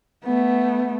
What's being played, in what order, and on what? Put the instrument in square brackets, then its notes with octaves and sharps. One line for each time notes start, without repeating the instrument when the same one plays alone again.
[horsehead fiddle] A3 B3